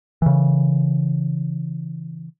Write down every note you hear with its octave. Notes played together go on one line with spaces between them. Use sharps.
C#3 E3